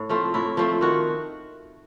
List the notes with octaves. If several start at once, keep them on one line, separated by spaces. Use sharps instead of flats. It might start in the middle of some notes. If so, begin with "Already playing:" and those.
Already playing: A2
F3 A3 C4
A2 E4
F3 A3 C4
D#3 F#4